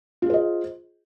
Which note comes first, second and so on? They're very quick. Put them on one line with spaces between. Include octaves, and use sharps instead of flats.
F4 G#4 C5 D#5